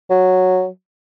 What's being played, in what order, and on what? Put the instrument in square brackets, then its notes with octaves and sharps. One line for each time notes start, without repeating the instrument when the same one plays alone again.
[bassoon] F#3